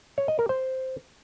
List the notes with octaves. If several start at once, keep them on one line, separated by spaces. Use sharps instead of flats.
C#5
D#5
A#4
C5